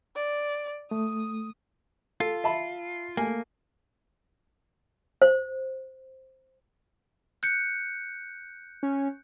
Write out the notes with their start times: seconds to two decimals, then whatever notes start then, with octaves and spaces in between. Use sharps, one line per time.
0.16 D5
0.91 A3 D#6
2.20 F4 A4
2.44 E5 A5 B5
3.17 A3 A#3 G#5
5.22 C5
7.43 F#6 G6 C#7
8.83 C#4